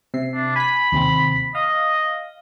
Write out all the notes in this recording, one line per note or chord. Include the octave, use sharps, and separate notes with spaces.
C3 E5 C7
D4
G#5 B5 B6
D#2 C3 C4
D#5 F5